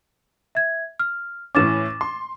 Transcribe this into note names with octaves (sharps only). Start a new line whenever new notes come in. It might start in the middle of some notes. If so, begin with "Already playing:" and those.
E5 G#6
F6
A2 E3 C#4 D6 A6 E7
C6